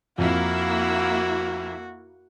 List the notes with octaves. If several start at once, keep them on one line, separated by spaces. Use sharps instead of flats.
F2 A#3 E4 F#4